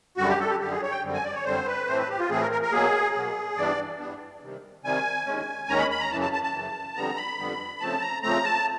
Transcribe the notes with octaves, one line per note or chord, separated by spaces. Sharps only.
F#2 D3 G3 F#4
G4
A4
G4
F#2 D3 G3 G4
G#4
C#5
G5
F#2 D3 G3 C4
G#5
D5
C#5
F#2 D3 G3 C4 C5
B4
A2 E3 A3 C4 C5
B4
G4
F4
A2 E3 A3 C4 G#4
A#4
A#4
A#4
B2 F#3 A#3 G#4
B2 F#3 A#3
G2 E3 G3 B3 D4 D5
G2 E3 G3 B3 D4
C3 D#3 G3
C3 D#3 G3 G#5
D#2 D#3 G#3 C#4
D#2 D#3 G#3 C#4 A#5
B5
B5
A#5
F#2 C#3 E3 A5
A5
A5
A5
F#2 C#3 E3
F2 D3 G3 B3 A#5
B5
F2 D3 G3 B3
C#3 F3 A3 C4 A5
A#5
C#3 F3 A3 C4 A#5
A5